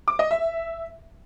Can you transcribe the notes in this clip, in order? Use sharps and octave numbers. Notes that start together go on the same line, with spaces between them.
D6
D#5
E5